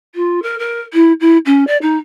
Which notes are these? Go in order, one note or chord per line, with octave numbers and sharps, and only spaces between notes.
F4
A#4
A#4
E4
E4
C#4
D5
D#4